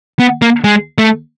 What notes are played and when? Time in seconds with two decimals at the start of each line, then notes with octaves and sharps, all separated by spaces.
0.19 B3
0.42 A#3
0.64 G#3
0.98 A3